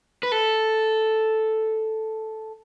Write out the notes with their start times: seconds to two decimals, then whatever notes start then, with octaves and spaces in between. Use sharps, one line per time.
0.23 B4
0.32 A4